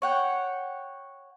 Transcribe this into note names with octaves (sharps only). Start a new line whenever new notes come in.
C#5 F#5 G5